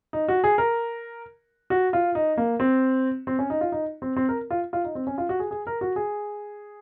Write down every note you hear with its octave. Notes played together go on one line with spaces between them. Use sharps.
D#4
F#4
G#4
A#4
F#4
F4
D#4
A#3
C4
C4
C#4
D#4
F4
D#4
C4
C4
A#4
F4
F4
D#4
C4
C#4
F4
F#4
G#4
G#4
A#4
F#4
G#4